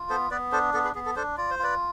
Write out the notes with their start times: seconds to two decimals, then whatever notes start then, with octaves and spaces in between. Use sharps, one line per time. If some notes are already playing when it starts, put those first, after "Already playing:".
Already playing: F4
0.10 B3 A4 C5
0.31 B3 B4 D5
0.52 D4 A4 C5
0.74 B3 A4
0.84 G#4 B4
0.95 B3 G#4
1.06 A4
1.16 D4 A4 C5
1.37 F4 D5
1.51 C5
1.59 F4 B4 D5